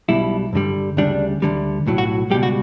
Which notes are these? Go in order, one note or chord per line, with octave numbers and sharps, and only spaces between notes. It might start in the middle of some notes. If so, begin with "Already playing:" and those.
B1 B2 G3 E4
G2 D3 G3
D2 C#3 G3 D4
D2 D3 G3
B1 A2 F#3
F#4
C#2 B2 G3 G4
F#4